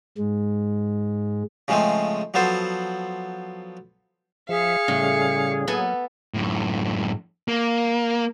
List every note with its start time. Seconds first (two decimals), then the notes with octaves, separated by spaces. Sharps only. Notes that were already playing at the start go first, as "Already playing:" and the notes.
0.18 G#2 G#3
1.68 C#3 F3 G#3 A3 C4
2.34 F3 F#3 B3 A4 C5
4.49 F3 G#4 E5 F5 C#7
4.88 A2 C#3 G3 C#4
5.67 F#3 A#3 B3 A4 G#5
6.34 F#2 A2
7.48 A#3